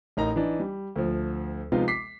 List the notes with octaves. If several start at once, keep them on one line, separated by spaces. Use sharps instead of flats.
A1 D#4 A#4 A#5
E3 D4 D#4
G3
D2 F3
C3 F3 G#3 B3 D#4 F4
D6 B6 C7